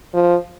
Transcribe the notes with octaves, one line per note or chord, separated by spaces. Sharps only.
F3